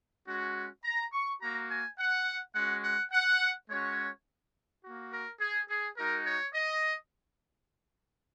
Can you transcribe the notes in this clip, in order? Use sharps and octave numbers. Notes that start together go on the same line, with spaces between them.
G#3 C#4 F#4
A#5
C#6
A#3 F#4 A#5
G#5
F#5
G#3 C#4 F#4 F#5
F#5
F#5
G#3 C#4 F#4 C#5
A#3 F#4
A#4
G#4
G#4
G#3 D#4 F#4 A#4
C#5
D#5